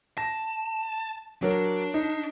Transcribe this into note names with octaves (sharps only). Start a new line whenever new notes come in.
A5 A#6
F#3 D4 A#4
D#4